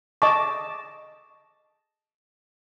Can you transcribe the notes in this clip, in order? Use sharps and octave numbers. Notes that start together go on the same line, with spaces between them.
D#5 A5 C#6 D6